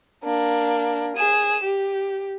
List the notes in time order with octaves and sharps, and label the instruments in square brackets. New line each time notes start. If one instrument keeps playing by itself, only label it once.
[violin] A#3 D4
G#4 E7
G4